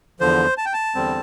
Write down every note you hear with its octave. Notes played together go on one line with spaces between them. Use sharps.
E2 D3 F3 C5
A5
G5
A5
E2 D3 G3 C4